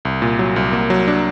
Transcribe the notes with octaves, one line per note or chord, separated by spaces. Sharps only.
C2
A#2
F#3
C2
A#3
F#3
D4